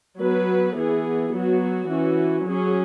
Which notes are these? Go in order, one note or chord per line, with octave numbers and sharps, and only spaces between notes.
F#3 B3 B4
E3 B3 G#4
F#3 B3 F#4
F#4
E3 C#4
F#3 C#4 G#4